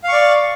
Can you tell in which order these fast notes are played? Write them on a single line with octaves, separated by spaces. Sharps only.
F5 C#6 D5